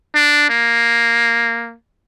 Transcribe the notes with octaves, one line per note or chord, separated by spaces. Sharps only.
D4
A#3